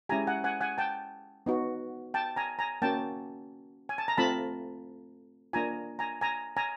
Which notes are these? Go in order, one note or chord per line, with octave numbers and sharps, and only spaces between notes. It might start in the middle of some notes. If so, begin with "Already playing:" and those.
G#3 C#4 E4 G4 G#5 A#5
F#5 G#5
F#5 G#5
F#5 G#5
G5 A5
B3 D#4 F#4
G5 A5
G#5 A#5
G#5 A#5
A#3 C#4 F#4 G5 A5
G#5
A5
A#5
A3 C4 F4 A5 B5
A#3 D4 F4 G#5 A#5
G#5 A#5
G#5 A#5
G#5 A#5